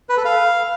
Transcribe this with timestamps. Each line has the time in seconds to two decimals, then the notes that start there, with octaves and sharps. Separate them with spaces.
0.09 B4
0.17 A4
0.25 F5